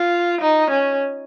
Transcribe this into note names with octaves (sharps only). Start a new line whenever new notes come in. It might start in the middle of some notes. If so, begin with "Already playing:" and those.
Already playing: F4
D#4
C#4